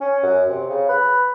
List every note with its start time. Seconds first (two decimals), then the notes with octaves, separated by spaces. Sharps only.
0.01 C#4
0.23 F#2
0.49 C3
0.70 C#3
0.89 B4